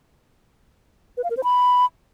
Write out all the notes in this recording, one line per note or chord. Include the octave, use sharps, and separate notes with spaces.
B4
F5
A#4
C5
B5